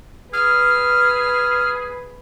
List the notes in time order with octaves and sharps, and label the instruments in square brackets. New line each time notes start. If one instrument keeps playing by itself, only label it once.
[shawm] G#4 [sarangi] B4 [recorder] F6